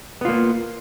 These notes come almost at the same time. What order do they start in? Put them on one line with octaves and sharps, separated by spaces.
B3 F4 A#3